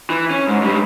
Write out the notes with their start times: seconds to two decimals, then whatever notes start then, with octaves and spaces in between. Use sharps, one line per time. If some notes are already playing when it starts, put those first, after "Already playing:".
0.10 E3
0.30 C#4
0.48 G#2
0.62 G#2 G3